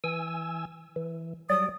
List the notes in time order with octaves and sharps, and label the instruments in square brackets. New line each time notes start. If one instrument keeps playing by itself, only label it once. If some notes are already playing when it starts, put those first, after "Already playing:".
[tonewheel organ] E3 G#5 E6
E3
[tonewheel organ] F#3 G3 D5 [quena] D#6